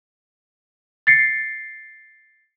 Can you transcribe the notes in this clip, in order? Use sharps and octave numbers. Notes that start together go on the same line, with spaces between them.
A6 C7 C#7